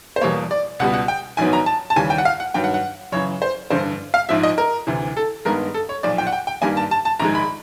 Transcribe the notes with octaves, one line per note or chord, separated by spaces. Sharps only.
C5
E2 B2 G3 A#3 C#5
D5
C#2 B2 G3 B3 F#5
F#5
G5
A#1 G#2 D#3 F#3 B3 G#5
A#5
A5
A5
D#2 C#3 E3 G3 G#5
G5
F#5
F5
F#5
G2 D#3 F#3 G5
F#5
F#5
F#2 C#3 E3 C#5
C5
A1 G2 D3 C5
F5
A#1 G#2 F3 E5
D#5
A#4
D2 C3 E3
A4
G2 D#3 G#3 B3 A#4
A4
C#5
B1 A#2 F3 D5
G5
F#5
G5
G5
G2 D#3 G3 A#3 G#5
A5
A5
A5
A#1 G#2 D#3 G#3 A#5
B5